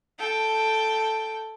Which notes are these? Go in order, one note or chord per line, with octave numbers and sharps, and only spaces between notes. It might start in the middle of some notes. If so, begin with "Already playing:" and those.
A4 G5